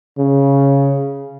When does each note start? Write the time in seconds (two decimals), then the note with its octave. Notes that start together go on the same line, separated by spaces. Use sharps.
0.18 C#3